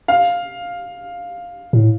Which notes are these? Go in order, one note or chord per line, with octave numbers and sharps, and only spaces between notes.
F5
A2